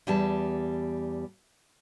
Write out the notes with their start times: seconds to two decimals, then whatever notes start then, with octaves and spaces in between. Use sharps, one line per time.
0.07 E2 G3 A5